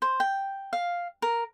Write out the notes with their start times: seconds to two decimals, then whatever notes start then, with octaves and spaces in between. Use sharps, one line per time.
0.02 C5
0.20 G5
0.73 F5
1.22 A#4